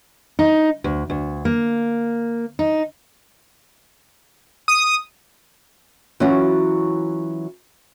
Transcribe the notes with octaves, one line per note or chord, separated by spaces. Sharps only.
D#4
D2
D2
A#3
D#4
D#6
E3 F#3 C#4 F4 F#4